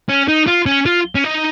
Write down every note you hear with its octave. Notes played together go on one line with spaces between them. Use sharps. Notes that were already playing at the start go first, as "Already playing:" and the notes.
C#4
D#4
F4
C#4
F4
C#4
D#4